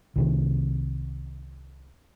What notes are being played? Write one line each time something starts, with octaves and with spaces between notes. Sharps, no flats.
C2 C3 D#3